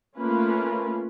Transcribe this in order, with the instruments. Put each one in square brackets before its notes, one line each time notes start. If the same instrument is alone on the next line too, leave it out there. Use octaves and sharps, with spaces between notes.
[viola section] A3 A#3 C#4 F4 A#4 B4